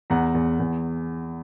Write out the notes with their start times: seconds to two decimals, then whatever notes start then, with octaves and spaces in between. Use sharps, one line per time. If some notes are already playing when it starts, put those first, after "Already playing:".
0.10 E2 F#5 A#5
0.35 E2
0.60 E2